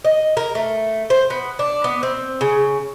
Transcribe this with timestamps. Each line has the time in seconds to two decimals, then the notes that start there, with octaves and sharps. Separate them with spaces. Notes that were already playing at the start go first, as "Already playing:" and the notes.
0.05 D#5
0.37 A#4
0.55 A3
1.10 C5
1.30 B3
1.59 D4
1.84 B3
2.03 C4
2.41 C#3